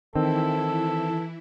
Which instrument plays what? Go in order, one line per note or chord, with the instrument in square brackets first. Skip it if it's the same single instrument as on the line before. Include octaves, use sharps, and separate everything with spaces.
[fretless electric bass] D#3 [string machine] E3 E4 [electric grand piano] C4 [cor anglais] A4